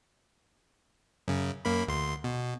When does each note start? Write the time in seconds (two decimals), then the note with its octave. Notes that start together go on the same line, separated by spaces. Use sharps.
1.28 F#2 C#3
1.65 F#2 A#3 B5
1.88 D2 C6
2.24 B2